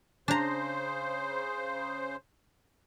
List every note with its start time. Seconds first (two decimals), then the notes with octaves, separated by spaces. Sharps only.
0.28 C#3 D4 C5 A#5